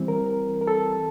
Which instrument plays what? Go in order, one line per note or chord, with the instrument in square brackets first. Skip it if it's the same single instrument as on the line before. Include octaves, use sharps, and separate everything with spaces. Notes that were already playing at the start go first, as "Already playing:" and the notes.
Already playing: [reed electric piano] E3 G3 C4
A#4
A#4
A4